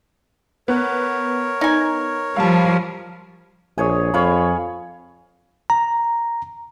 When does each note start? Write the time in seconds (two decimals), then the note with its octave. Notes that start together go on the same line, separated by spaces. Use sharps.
0.68 B3 A#4 C#5 F#6
1.61 D#4 G#5
2.36 F3 G3 F5 A5
3.78 A#1 G#4 C#5 G#5
4.14 F2 C#5 F5 B5
5.70 A#5